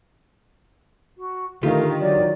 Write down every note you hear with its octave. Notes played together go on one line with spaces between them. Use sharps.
F#4
D3 D#3 A3 F4 G4 F5
F#3 D5